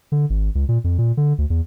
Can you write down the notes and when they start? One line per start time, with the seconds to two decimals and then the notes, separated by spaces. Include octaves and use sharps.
0.12 D3
0.30 G#1
0.55 C#2
0.69 A#2
0.84 F2
0.98 A#2
1.17 D3
1.38 D2
1.50 E2